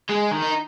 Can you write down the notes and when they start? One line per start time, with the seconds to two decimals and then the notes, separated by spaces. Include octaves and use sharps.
0.09 G#3
0.31 D#3
0.42 D#4